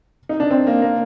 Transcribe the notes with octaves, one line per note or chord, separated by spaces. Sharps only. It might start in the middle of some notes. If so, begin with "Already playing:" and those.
D#4
D4
C4
A#3
A#3